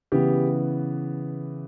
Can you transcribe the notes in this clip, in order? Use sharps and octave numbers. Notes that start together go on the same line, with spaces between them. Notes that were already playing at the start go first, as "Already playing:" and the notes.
C#3 E3 B3 G4